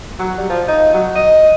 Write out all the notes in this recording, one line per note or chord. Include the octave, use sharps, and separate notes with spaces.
F#3
G3
F3
D#4
F#3
D#5